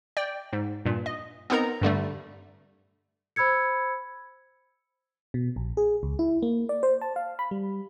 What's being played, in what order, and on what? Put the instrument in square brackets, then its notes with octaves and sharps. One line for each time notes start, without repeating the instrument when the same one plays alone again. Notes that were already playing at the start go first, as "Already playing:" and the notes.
[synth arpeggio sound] D5 G5
G#2
G2 A#2
D#5
B3 C4 D#4 A#4 A#5
G2 D3 G3 A3
[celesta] C5 B5 E6 G#6 C#7
[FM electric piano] B2
A#1
G#4
C#2
E4
A#3
D5
C5
A5
F5
B5
G3